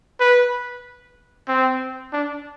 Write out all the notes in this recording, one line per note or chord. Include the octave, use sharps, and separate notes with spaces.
B4
C4
D4